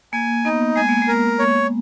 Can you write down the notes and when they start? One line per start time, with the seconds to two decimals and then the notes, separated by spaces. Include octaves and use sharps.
0.13 A#3 G#5
0.45 B3 D#4
0.76 G#3 G#5
0.89 A#3
1.02 G#3
1.08 A#4
1.39 C#5